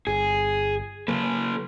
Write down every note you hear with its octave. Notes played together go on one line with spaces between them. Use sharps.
G1 G#4
C#3 F#3 A#3 A4 B4